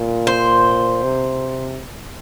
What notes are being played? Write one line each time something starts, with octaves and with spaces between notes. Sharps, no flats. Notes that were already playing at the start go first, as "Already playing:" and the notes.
Already playing: A#2
C5
C3